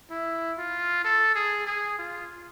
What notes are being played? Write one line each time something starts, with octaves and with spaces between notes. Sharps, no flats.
E4
F4
A4
G#4
G#4
F4